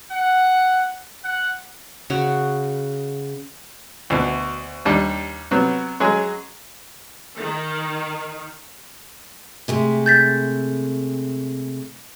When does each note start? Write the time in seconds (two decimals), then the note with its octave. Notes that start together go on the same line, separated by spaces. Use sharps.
0.12 F#5
1.24 F#5
2.10 C#3 F#4 C#5
4.10 D2 B2
4.85 D#2 G3 D4
5.51 C3 F#3 B3
6.00 F#3 G#3 C#4 G#4
7.37 D#3
9.68 C3 G#3 A3
10.06 G6 A6 B6